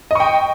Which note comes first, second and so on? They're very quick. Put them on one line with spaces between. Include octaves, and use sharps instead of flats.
D#5 C#6 G5